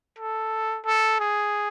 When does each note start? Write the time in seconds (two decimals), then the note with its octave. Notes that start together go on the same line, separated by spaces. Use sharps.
0.19 A4
0.86 A4
1.20 G#4